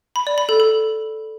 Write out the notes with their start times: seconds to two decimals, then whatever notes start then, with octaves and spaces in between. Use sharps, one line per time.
0.16 B5
0.27 D5
0.38 B5
0.49 A4
0.60 A4